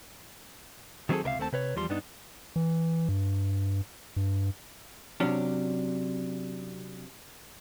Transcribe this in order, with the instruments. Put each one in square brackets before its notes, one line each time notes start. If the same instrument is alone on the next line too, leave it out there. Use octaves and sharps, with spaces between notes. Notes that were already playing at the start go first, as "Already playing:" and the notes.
[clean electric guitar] D#3 F#3 C4 E4 G#4 A4
C#2 C3 A#4 E5 F5
D#2 A3 C4 A5
C3 B4 C#5
E2 F3 G3 C6
G2 B3 D4 D#4
[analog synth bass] E3
G2
G2
[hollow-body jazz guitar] C3 F#3 C#4 D4